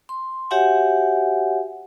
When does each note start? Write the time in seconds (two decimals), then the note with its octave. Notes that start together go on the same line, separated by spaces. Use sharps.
0.09 C6
0.51 F#4 G4 C#5 E5 F#5 G#5